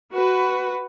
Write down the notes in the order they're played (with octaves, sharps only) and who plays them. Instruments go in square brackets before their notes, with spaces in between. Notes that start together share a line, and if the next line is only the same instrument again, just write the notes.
[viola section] F#4 B4